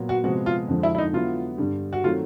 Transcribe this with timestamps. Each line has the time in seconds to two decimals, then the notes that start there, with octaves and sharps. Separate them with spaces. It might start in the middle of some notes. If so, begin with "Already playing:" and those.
Already playing: A#2 F#3 B3
0.09 F#4
0.24 C3 F3 G#3 B3 F#4
0.46 F4
0.68 F2 D3 F3 G#3
0.83 E4
0.95 E4
0.98 D#4
1.13 D3 F#3 B3 E4 F4
1.58 G2 D3 G3
1.93 F#4
2.04 D#3 F#3 A3 C4 F4